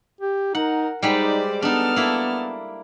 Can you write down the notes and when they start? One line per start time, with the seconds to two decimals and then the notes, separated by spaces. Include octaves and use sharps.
0.21 G4
0.55 D#4 A#4 F#5
1.03 G3 G#3 D#4 B4 C5 D5
1.62 B3 D4 D#4 A4 A5 F6
1.96 A#3 E4